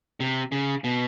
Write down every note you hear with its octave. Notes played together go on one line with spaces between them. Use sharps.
C3
C#3
B2